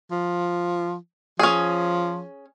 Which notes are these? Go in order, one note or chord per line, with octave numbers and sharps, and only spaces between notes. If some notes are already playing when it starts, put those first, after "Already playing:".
F3
F3 C#4 G#4